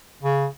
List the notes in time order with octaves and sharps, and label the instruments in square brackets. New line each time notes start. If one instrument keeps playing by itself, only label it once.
[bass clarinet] C#3